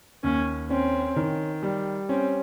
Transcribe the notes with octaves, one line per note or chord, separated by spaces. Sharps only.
D#2 C#4
C4 C#4
D#3
G3
C4 C#4